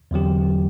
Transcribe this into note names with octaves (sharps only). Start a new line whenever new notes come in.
E2 D3 F#3 C4 G4